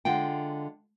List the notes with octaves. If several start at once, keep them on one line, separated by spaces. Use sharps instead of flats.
D3 G#3 F4 F#5 G5